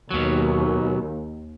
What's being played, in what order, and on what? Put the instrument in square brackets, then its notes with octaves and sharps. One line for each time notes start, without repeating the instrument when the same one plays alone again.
[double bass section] D#2 [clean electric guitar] B2 F#3